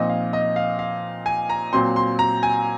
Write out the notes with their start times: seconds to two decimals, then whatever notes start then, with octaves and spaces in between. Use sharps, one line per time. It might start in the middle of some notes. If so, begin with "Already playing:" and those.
Already playing: A#2 F3 C4 D#4 D#5
0.09 F5
0.33 D#5
0.56 F5
0.79 F5
1.26 G#5
1.49 A#5
1.73 A#2 F#3 C4 C6
1.96 C6
2.19 A#5
2.43 G#5